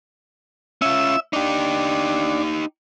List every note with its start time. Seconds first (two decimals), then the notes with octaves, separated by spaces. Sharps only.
0.82 C#4 F4 E5 E6
1.33 D4 D#4 G4